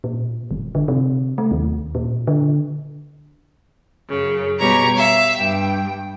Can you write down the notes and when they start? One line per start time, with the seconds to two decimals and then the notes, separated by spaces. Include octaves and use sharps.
0.04 A#2
0.51 F#1
0.75 D3
0.88 C3
1.38 A3
1.51 D#2
1.95 A#2
2.27 D3
4.08 F#2 C#3
4.58 B2 G3 G4 C#5 A#5 C#6
4.96 E5 F5
5.36 G2 G5